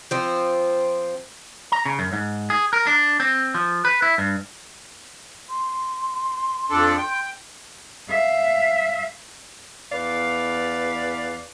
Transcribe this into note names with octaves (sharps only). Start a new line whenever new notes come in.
F3 C4
A#5
C#3
F#2
G#2
G#4
A#4
D4
C4
F3
B4
E4
G2
C6
F2 D4 A4
G5
E5 F5
E2 B4 D5 F5